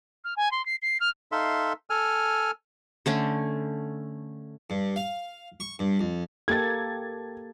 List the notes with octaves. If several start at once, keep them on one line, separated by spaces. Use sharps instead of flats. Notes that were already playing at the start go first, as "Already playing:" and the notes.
F6
G#5
C6
C7
C7
F6
D#4 A4 E5 F5 C6
A4 G#5 F6
D3 A3 C#4
G2
F5
C#6
G2
F2
A#3 G4 A4 G#6 A6